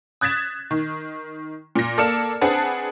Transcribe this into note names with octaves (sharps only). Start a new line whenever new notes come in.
D#6 F#6 G#6 A6 B6 E7
D#3
A#2 A#6
A#3 A4 D5 F6 C#7 E7
C4 D4 G#4 B4 F#5 A5